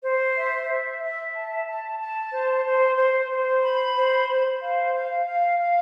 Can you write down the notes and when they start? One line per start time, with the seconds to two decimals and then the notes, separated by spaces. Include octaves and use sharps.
0.03 C5
0.37 E5
0.69 E5
1.02 E5
1.35 A5
1.67 A5
2.00 A5
2.32 C5
2.65 C5
2.97 C5
3.30 C5
3.63 B5
3.95 C5
4.28 C5
4.62 F5
4.94 F5
5.26 F5
5.59 F5